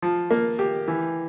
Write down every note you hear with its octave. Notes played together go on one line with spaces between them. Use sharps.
F3
A#3
G4
E3